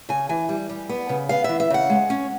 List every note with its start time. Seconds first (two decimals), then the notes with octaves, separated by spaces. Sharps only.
0.09 C#3 G#5
0.29 E3 G#5
0.49 G3
0.69 G3
0.89 B3
1.09 C#3
1.29 B3 F5
1.44 E3 E5
1.60 E5
1.70 C#3 F#5
1.90 G#3
2.10 C#4